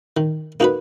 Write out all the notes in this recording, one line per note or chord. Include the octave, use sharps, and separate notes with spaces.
D#3
A#3 D#4 F#4 B4